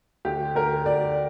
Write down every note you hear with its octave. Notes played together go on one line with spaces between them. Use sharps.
D2 G4
D2 A#4
D2 D5